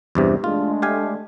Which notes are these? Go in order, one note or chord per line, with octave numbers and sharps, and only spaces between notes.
E2 G2 C3
G#3 A3 D4 F4
G4 F5 G#5